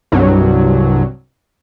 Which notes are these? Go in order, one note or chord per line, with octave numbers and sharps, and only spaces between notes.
C2 G2 F#3